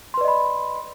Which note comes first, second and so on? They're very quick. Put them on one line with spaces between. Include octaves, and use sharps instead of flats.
C6 B4 D5 D#5 B5